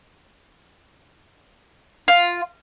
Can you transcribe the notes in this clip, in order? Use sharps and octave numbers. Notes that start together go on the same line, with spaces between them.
F4